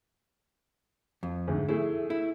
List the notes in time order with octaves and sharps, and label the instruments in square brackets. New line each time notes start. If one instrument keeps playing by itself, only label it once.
[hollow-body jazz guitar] F2
[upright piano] D2 G#2
[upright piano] A3 G#4 [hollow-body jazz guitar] E4
[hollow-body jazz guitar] E4